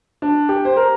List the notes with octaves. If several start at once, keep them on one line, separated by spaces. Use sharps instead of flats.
D4
G4
C5
A#4